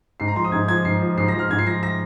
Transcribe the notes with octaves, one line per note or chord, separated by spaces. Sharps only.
G#2 C7
A#5
F3 C6
D#6
G#2 G#6
F3 G#6
G#2 C7
F3
G#2 C7
A#6
F3 F6
G#2 G#6
C7
F3 A#6
A#6